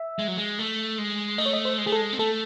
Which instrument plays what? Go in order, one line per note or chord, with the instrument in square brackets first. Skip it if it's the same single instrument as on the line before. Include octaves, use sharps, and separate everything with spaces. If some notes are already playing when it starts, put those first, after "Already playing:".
Already playing: [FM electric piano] E5
[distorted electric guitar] G#3
F#3
G#3
A3
G#3
[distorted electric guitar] A3 [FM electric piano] D#5
[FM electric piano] C#5
D#5
C5
[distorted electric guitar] G#3
[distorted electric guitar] A3 [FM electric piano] G#4
[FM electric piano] A4
[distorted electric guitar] G#3
C4
[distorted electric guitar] A3 [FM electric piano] A4